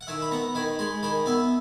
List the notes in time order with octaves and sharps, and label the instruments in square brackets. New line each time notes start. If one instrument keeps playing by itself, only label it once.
[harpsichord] F#5
D#3 E5 G#5
B5
B3 F#5 A#5
D#3 G#5 B5
G#3 G#5 B5
D#3 G#5 B5
B3 E5 G#5